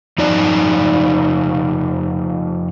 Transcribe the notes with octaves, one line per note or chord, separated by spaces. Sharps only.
F2 D#4 D5